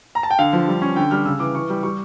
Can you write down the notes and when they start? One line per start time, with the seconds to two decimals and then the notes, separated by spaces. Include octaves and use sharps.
0.15 A#5
0.23 A5
0.30 G5
0.39 D3 F5
0.53 F3
0.68 G3
0.82 C#4
0.96 D3 G5
1.11 G3 F6
1.26 C#3 E6
1.40 E3 D6
1.55 E3 C#6
1.70 G3
1.83 G3 C#6